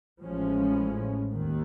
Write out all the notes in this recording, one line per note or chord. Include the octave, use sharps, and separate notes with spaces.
A1 A2 F3 G#3 C#4
D#2 D#3